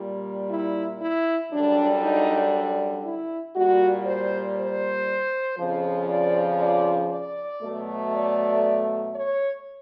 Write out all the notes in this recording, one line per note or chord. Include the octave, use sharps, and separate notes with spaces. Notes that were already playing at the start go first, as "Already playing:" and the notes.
Already playing: A#2 G3
E4
E4
F#2 D3 G3 D4
D#4
E4
A#2 G3 F#4
C5
C5
F2 C#3 F3
D5
D5
D5
B2 F#3 A3
D5
C#5